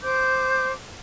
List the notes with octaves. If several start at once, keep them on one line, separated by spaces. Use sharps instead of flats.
C5 D6 G6